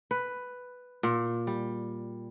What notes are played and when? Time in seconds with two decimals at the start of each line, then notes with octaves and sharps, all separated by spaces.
0.11 B4
1.03 A#2
1.47 G3